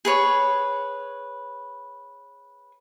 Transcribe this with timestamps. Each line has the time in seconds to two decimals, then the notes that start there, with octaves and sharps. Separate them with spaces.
0.05 G#4 B4 C#5